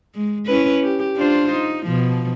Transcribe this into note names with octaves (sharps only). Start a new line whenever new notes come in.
G#3
C#4 E4 B4
G4
D4 F4 C5
D#4
B2 F3